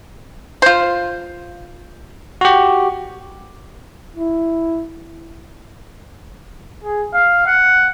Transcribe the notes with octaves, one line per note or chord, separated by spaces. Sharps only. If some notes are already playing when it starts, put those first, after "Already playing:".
F4 C5
F#4 G4
E4
G#4
F5
F#5